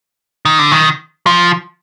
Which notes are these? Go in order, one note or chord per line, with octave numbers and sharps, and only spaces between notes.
D#3
D3
D#3
F3